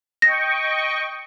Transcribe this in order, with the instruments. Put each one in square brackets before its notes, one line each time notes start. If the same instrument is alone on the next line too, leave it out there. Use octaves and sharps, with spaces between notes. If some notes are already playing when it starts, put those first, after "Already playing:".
[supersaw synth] D#5 G5 C#6 [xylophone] A#6